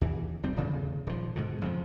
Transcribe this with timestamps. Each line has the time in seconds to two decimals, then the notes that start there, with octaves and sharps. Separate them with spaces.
0.01 D#2 E3
0.43 F1 G3 C4
0.56 D1 G#1 E2 C#3
1.07 D#1 F3
1.36 G#2 B2 D3
1.62 F2 C#3 F3